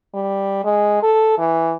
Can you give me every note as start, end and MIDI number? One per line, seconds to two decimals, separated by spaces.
0.15 0.64 55
0.64 0.99 56
1.03 1.37 69
1.38 1.74 52